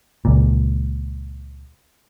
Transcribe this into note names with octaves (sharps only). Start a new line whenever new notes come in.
C#2 A#2